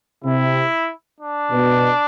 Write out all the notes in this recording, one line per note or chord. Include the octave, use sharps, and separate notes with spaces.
C3 E4
D4
B2